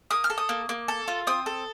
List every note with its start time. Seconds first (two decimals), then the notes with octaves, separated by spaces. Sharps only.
0.11 A#3 D#6
0.24 F6
0.30 A4
0.38 D#6
0.49 A#3
0.69 A#3
0.88 A4
1.08 F4
1.27 C4 D#6
1.46 A4